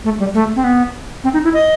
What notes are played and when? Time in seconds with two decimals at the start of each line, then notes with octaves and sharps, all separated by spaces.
0.04 A3
0.19 G3
0.34 A3
0.56 C4
0.64 B3
1.24 C4
1.34 D#4
1.44 E4
1.54 D#5